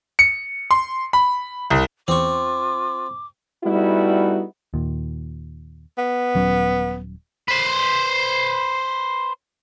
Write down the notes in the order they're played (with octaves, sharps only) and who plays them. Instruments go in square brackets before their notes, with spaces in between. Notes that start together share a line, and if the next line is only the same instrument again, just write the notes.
[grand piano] C#7
C6
B5
C2
[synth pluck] E2 [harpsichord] C4 C#6 [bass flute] F4 [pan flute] D6
[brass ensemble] G3 A3 B3 D#4 E4 F#4
[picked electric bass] D#2 A#2
[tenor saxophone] B3
[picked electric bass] D#1 F#3 C#4
[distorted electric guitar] B4 C5